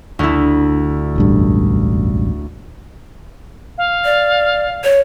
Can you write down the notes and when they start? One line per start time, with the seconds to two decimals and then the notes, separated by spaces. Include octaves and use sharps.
0.19 D2 E4
1.16 E1 A1 G2
3.78 F5
4.04 D5
4.84 C#5